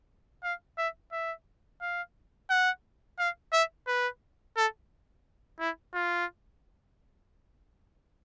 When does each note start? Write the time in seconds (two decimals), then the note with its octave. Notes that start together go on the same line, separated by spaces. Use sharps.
0.43 F5
0.78 E5
1.12 E5
1.82 F5
2.50 F#5
3.19 F5
3.53 E5
3.87 B4
4.56 A4
5.60 E4
5.94 F4